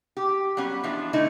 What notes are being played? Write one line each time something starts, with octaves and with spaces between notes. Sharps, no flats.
G4
F#3 G3 B3 C#4
E3 F3 B3 D4 F4
D3 A3 D#4 E4